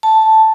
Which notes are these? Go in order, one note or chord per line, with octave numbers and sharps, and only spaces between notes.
A5